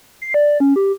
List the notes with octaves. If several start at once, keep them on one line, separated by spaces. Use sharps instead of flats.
C7
D5
C#4
G4